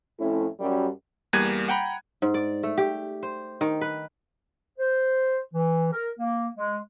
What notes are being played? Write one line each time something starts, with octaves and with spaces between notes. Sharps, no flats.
F2 A2 F3 A3 C#4 E4
F#2 G3
E2 G3 A#3 F#6 G#6 D#7
F#5 G5 A#5 B5
G#2
D5
A3
G4
C5
D#3
B4
C5
E3
A#4
A#3
G#3